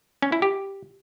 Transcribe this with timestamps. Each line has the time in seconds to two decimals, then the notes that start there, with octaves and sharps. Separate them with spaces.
0.22 C#4
0.32 E4
0.42 G4